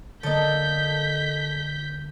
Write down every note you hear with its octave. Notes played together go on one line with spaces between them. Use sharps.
D3 A#3 A4 D#5 G6 B6